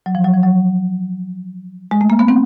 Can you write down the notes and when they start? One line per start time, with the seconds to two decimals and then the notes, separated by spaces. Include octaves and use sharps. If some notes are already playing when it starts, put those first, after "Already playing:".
0.06 F#3
0.15 F3
0.24 F#3
0.34 F3
0.43 F#3
1.91 G#3
2.01 A3
2.10 A#3
2.19 B3
2.28 C4